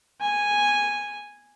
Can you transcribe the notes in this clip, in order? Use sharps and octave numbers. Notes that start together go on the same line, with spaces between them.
G#5